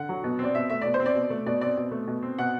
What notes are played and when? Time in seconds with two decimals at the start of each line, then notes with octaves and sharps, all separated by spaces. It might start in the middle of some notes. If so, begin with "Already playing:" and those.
Already playing: D3 F#5
0.09 F#3
0.24 B2
0.39 C4 D5
0.55 B2 E5
0.70 A3 E5
0.82 B2 D5
0.94 C5
1.00 C4
1.06 D5
1.15 B2
1.30 A3
1.46 B2 D5
1.61 C4 D5
1.77 B2
1.91 A3
2.08 B2
2.22 C4
2.39 B2 F#5